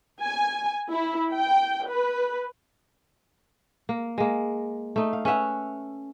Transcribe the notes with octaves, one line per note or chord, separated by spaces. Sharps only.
G#5
E4
G5
B4
A#3
G#3 A#3
A3 D#4
F5
C#4 B4 E5 F#5